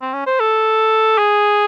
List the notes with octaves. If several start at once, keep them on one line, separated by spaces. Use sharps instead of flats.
C4
C#4
C5
A4
G#4